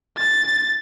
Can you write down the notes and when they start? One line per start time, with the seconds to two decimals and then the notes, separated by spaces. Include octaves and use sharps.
0.17 A6